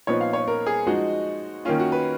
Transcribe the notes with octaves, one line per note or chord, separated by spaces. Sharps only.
A#2 F3 B3 D#4 C#5
F5
C#5
A#4
G#4
F3 G#3 D#4 F#4
D#3 A#3 C#4 F4
F#4
B4